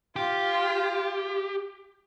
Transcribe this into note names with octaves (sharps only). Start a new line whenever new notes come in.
F4 G4